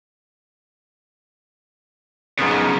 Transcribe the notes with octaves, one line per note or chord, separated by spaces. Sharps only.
B1 G#2 C#3 F3 B3